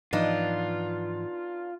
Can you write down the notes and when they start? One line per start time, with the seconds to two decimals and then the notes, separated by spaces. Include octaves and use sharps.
0.13 G#2 E3 F3 B3 D4 D#4 F4